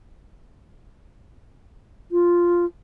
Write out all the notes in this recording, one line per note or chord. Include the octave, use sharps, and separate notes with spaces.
F4